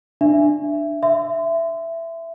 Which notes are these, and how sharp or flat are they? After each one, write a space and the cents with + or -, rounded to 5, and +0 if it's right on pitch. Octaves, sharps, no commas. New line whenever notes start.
D4 +20 E5 +15
E5 +10 C6 -30